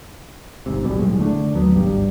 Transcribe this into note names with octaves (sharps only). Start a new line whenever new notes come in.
G#1 G#2 C3
A#1 B2 G3
D#1 F#2 A2 G#3
D3 A3 D4
D#2 F#3 B3
G#1 C#2 G2 G3